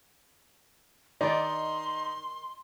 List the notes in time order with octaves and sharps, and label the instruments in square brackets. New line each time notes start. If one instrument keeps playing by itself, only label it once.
[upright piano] D#3 [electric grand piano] D#4 [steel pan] D5 [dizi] C6